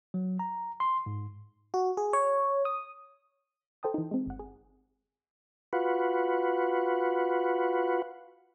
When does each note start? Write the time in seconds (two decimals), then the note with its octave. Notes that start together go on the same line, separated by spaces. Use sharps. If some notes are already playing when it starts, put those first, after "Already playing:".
0.14 F#3
0.39 A#5
0.80 C6
1.06 G#2
1.74 F#4
1.97 G#4
2.13 C#5
2.65 D#6
3.83 A4 C5 G5 A5 D#6
3.94 E3 D#4
4.11 G#3 C4
4.26 G1 F#5
4.39 G#4
5.73 F4 F#4 B4